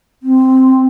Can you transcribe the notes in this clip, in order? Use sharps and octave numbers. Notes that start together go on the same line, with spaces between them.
C4